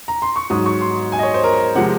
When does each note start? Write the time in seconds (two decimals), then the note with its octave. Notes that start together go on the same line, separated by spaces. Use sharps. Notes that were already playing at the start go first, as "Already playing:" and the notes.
0.08 A#5
0.22 C6
0.36 C#6
0.50 G#2 F#3 D#6
0.66 C#6
0.81 C6
1.12 G#5
1.19 D#5
1.23 C#5
1.34 C5
1.44 A#4
1.75 C3 F3 G#3 F#5